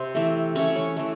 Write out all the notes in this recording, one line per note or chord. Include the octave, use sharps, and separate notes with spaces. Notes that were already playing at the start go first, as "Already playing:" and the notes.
Already playing: C3 C4 C5
E3 A3
E3 A3 C#4 C#5
C#4 C#5
E3 A3